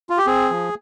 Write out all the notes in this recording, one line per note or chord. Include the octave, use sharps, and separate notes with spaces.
F4
G4
C4 G#4
F3